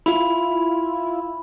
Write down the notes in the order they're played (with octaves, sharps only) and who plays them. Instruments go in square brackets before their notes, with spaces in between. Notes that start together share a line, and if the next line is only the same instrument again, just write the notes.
[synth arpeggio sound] E4 F4 [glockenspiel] B5